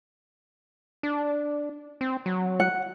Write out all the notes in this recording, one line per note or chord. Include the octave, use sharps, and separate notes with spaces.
D4
C4
F#3
F#5